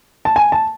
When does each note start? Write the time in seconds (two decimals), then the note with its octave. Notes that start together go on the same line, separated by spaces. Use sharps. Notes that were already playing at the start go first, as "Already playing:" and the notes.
0.25 A5
0.36 G#5
0.52 A5